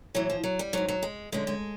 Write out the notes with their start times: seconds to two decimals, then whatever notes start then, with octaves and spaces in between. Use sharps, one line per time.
0.14 A2 E3 F#3
0.30 F3
0.43 F#3
0.59 G3
0.73 G#2 D#3 F#3
0.88 F#3
1.03 G#3
1.32 F#2 D3 G#3
1.47 G#3